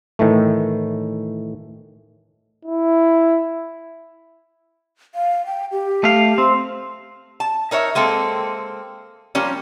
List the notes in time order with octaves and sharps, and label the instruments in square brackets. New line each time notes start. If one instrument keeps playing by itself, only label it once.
[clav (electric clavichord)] A2 D#3 E3 A3
[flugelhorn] E4
[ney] F5
G5
G4
[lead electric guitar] A3 F5
C4
[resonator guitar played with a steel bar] A5
D#4 A#4 C#5 E5
G#3 A#3 C4 A4
F3 G3 A#3 C#4